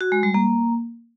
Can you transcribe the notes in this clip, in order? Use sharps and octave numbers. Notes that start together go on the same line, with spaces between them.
F#4
G#3
G3
A#3